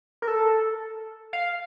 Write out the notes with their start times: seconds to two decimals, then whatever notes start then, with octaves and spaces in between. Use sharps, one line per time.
0.22 A#4
0.28 A4
1.33 F5